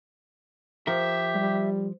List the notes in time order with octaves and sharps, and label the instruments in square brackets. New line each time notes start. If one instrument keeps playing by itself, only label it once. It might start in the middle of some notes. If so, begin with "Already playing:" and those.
[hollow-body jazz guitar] F3 A#4 [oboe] G4 [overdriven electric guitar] E5
[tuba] G3